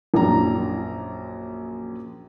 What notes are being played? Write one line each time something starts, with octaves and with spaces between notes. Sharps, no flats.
A#1 F#2 D4 A#5